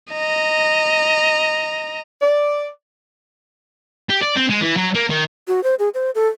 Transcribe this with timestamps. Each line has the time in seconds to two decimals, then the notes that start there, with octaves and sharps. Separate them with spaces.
0.12 D#5 A#5
2.22 D5
4.09 G4
4.22 D5
4.36 C4
4.49 G#3
4.61 E3
4.77 F#3
4.95 A#3
5.10 D#3
5.48 F#4
5.64 C5
5.79 G#4
5.94 C5
6.15 A4